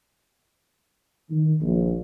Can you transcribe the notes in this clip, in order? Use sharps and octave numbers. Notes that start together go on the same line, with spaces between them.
D#3
A#1